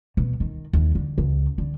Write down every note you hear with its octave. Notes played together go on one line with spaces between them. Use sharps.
B2
D#3
D#2
D3
C#2
D3